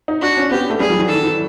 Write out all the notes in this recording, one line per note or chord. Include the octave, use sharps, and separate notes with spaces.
D#4
D4 F#4
C#4
B3 G4
A3
G3 G#4
F#3
E3
D#3 A4
E3